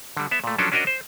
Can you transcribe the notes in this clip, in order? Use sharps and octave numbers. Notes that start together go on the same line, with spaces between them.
D3 G3
B3 E5
A#2 A3
F3 F#3 C#4 D4 A4
C#4 D4 F#4 A#4 D#5
C5